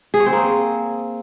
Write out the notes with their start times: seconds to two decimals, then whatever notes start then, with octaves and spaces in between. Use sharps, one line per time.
0.14 G#4
0.20 C#5
0.26 C4
0.33 A#3